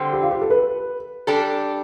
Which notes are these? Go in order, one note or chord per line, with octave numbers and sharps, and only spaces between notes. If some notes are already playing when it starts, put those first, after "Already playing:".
Already playing: D3 G3 C4
G4
F4
G4
A4
B4
G3 D4 A4